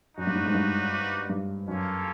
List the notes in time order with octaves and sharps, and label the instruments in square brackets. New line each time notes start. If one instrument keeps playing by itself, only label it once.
[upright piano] F#2 [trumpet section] D#4 F#4 B4 D5
[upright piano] G2
A2
G#2
G2
G2
[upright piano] F#2 [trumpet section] A#3 C#4 F4 A4